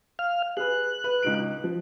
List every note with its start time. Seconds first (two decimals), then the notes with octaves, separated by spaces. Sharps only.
0.19 F5 F6
0.57 G#4 B4 F#6
1.04 B4
1.23 C#2 D#4 D7
1.64 F3